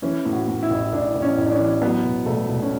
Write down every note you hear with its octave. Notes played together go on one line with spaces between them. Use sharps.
E3 C#4
A2
F#4
A2
E4
A1
A1 D4
A1
C#4
A1
D4
C#4
E3
F#3 B3
E1
E1 A3
E1
C#4